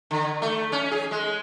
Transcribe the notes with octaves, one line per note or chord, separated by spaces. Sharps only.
D3
A3
C#4
G#4
G#3